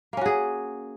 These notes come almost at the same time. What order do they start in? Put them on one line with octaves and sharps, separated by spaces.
A#3 C#4 F#4 G#4